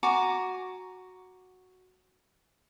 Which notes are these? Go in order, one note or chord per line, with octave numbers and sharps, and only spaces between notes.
F#4 G#5 A#5 D6